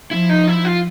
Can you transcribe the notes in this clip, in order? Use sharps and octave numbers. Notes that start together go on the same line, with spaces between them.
F3 E4
D#4
E4
F4